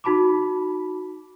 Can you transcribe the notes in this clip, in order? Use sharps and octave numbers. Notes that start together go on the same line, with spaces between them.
D#4 F#4 A5 B5 D6